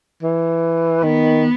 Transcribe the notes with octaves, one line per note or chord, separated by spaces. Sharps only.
E3
D#3 B3